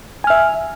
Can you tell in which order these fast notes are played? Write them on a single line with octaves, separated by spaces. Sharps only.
G#5 F6 E5